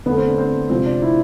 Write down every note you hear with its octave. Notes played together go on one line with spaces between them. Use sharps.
D3 A3 B3
C4
D4
C4
C3 F3 G#3 C4
D4
E4